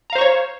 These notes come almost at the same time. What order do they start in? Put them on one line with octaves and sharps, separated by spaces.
A#5 F5 C5 C#6 C#5